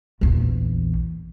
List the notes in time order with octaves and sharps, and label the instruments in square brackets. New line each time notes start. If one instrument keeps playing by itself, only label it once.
[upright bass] A#1 E2